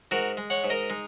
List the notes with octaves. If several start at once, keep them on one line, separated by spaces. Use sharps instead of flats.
G#2 F#4 A#4
G#3
C#5 F#5
G#2
A#4 D#5
G#3 D#4